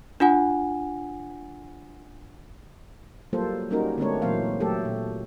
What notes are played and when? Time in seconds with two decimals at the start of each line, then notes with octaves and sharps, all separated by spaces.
0.20 D4 F4 F#5 G#5
3.33 F#3 G3 A#3 F4 A4 C5
3.70 G3 A#3 C#4 D#4 F#4 A#4
3.98 D3 G#3 A3 C4 D4 C#5
4.22 A#2 E3 F#3 A#3 C5 F5
4.60 F#3 A3 G4 A4
4.85 A#2